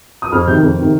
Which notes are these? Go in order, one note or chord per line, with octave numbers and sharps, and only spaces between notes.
D#6
F2 F6
C3 D#3 G6
F2
C3 D#3